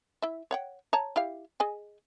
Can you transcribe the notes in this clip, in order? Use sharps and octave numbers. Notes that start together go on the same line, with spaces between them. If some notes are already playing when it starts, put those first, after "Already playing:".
E4 E5
C#5 F#5 G5
C#5 A5 A#5
E4 G4 F5
G#4 D#5 G#5